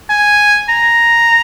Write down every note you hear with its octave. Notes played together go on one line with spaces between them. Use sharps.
G#5
A#5